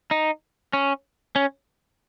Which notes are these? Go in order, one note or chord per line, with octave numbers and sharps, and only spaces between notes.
D#4
C#4
C#4